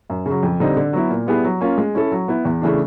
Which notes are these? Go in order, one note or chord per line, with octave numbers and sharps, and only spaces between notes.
F#2
C#3 F#3
F2
D3 G3 C4 D#4
D3
F#3 B3 E4
A#2
G3 B3 E4 G#4
F#3
A#3 C#4 F4
G#3
C#4 E4 A4
F#3
B3 E4
E2
C#3 E3 A3 D4